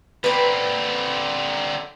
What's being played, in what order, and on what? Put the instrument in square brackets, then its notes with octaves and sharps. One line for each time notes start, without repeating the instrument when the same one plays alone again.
[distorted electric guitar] D3 C4 [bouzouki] B4 D5